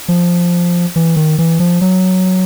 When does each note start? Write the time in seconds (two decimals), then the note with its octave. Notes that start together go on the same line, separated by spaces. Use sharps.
0.08 F3
0.96 E3
1.16 D#3
1.38 E3
1.60 F3
1.81 F#3